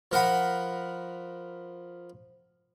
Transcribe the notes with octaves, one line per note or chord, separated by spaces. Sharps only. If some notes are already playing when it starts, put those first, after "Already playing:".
F3 A#4 F#5 B5